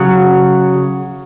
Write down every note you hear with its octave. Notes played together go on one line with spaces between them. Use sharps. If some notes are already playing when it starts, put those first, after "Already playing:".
Already playing: C#3 F#3